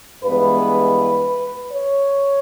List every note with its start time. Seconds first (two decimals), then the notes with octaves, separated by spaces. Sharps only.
0.24 G2 E3 G#3 B3 B4
1.70 C#5